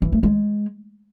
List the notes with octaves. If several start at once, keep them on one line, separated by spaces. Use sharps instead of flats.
E3
A3
G#3